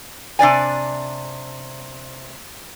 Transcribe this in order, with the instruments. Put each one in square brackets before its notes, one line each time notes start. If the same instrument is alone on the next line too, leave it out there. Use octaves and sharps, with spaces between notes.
[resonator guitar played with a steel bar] C3 D4 D5 G#5